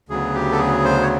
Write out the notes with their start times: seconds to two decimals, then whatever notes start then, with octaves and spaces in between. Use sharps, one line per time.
0.09 D2 C#3 F#3 B3 G#4
0.35 G4
0.52 A4
0.59 G#4
0.84 C5
1.02 C#5